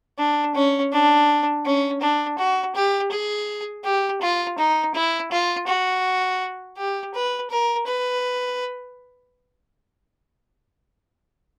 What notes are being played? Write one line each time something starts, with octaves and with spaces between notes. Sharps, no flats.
D4
C#4
D4
C#4
D4
F#4
G4
G#4
G4
F4
D#4
E4
F4
F#4
G4
B4
A#4
B4